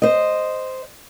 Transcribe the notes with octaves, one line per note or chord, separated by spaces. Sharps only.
C5 D#5